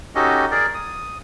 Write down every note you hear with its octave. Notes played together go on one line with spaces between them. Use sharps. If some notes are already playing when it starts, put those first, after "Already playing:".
C#4 D#4 F#4 G4 A4 D#5
G#4 A#4 D5
D#6